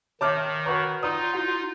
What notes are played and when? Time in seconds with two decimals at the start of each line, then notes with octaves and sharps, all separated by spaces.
0.21 D#3 C#5 E5 A5 D6 F6
0.66 F#4 B4 C#5 A#5
1.03 D#4 F4 D5 A#5 C6 D#6
1.34 E4 F#4 F#5